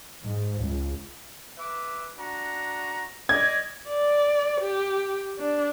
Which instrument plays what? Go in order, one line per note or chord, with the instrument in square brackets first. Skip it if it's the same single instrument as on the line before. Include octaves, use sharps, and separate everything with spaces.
[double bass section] G#2
C#2
[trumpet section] B4 E5 D6
D4 F#4 A#5
[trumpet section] D5 D#5 [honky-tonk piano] G#6
[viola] D5
G4
D4